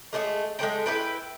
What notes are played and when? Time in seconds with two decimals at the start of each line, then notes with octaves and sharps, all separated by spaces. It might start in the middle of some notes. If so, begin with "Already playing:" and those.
0.13 G#3 A3 G4 G#4
0.59 G#3 A3 C4 G5
0.86 E4 B4 G5